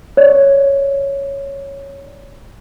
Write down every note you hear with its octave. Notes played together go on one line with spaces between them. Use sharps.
C#5 D5